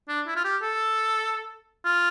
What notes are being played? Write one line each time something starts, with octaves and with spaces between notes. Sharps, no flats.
D4
E4
F4
G4
A4
F4